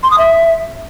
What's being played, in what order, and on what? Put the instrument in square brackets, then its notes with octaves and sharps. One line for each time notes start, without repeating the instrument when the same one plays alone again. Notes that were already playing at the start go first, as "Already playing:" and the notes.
[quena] C6
D#6
E5